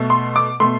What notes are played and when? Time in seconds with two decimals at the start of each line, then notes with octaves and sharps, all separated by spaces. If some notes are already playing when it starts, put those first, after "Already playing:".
Already playing: B2 A3
0.10 C6
0.36 D6
0.60 B2 A3 C6